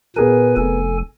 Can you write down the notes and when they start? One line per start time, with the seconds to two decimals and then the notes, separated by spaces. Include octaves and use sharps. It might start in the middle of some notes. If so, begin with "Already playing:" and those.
0.16 A#2 B3 G#4 A#4 B4 G#5
0.57 F1 A4 G#5